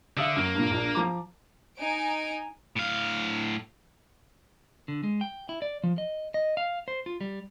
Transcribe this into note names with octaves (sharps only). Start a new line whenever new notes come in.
D3 E5 F5 D#6
F#2 A#3
G2 A#2
A#1 D4
F3 A#5 D6
D#4 G#5 D7
A2 F5
D3
G#3
G5
E4
D5
F3
D#5
D#5
F5
C5
F4
G3